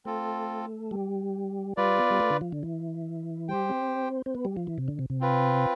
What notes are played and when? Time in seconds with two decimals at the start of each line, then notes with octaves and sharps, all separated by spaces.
0.05 A3 C4 F4 A4
0.91 G3
1.77 G3 F4 B4 D5
1.98 B3
2.10 G3
2.20 A3
2.30 D3
2.41 F3
2.52 D3
2.63 E3
3.48 G3 G4 C5 G5
3.69 C4
4.26 C4
4.35 B3
4.45 G3
4.57 F3
4.67 E3
4.78 C3
4.88 D3
4.99 C3
5.10 C3
5.20 C4 F4 B4